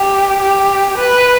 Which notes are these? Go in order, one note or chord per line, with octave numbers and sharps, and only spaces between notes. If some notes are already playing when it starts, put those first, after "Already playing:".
Already playing: G4
G4
B4